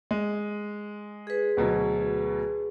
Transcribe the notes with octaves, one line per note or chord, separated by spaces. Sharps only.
G#3
G#4 B4
D2 B2 F#3